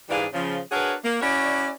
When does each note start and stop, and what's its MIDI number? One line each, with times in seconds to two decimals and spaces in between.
0.10 0.24 44
0.10 0.24 52
0.10 0.24 55
0.10 0.24 62
0.10 0.24 68
0.10 0.24 77
0.33 0.58 49
0.33 0.58 53
0.72 0.93 62
0.72 0.93 66
0.72 0.93 68
0.72 0.93 70
0.72 0.93 71
0.72 0.93 73
1.04 1.19 58
1.21 1.70 61
1.21 1.70 64
1.21 1.70 66
1.21 1.70 73
1.21 1.70 74